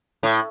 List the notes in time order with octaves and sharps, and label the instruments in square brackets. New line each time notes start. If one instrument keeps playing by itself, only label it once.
[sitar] A2